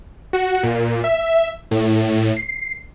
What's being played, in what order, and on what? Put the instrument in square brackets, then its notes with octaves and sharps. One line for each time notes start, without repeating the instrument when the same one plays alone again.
[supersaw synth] F#4
A#2
E5
A2
C7